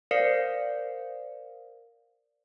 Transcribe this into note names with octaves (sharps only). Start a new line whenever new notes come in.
A#4 C5 D5 F5 C7 C#7